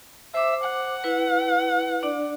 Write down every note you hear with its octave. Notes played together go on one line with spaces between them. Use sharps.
C5 E5 D6
F#5
E4 B4
D4 D5